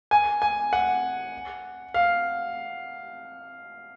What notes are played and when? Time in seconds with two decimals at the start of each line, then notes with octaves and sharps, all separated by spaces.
0.11 G#5
0.42 G#5
0.73 F#5
1.94 F5